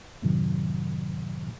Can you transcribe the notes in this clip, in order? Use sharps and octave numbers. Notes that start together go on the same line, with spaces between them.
F#2 A2 C3 D#3 F#3